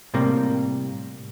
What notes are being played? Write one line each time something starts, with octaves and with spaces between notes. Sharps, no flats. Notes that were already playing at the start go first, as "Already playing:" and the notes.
A2 C3 G3 A#3